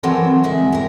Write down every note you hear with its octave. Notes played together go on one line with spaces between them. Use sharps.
E3 F#3 C4 A4 A#4
D2 G#3 E5
D#2 A#4